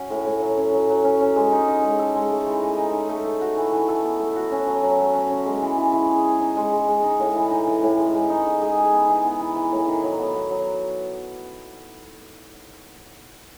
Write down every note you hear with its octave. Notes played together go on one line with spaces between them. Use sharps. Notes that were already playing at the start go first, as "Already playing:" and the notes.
Already playing: C#4 F#4
A2
A2
F#3
C#4
F#3
F#3
C#4
C#4
G#3
D#4
D#4
G#3
A4
G#3
A3
E3
D#4
D#4
D#4
A3
A4
F#4
E3
E3
A4
B3
A3
F#4
C#4
F#3
F#3
A3
C#4
C#4
G#3
E3
E3
E3
G#4
G#4
D#4
G#3
G#3
G#3
D#4
A2
E3
D#4
E3
A2
G#3
G#3
D#4
D#4
G#4
G#4
B3
E3
B3
E3
E3
A2
D#3
F#3
B3
B3
F#3